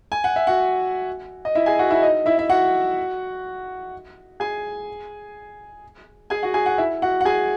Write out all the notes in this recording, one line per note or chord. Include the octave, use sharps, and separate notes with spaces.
G#5
F#5
E5
F#4 F#5
D#5
E4 E5
G#4 G#5
F#4 F#5
E4 E5
D#4 D#5
E4 E5
E5
F#4 F#5
G#4 G#5
G#4 G#5
F#4 F#5
G#4 G#5
F#4 F#5
E4 E5
F#4 F#5
F#5
G#4 G#5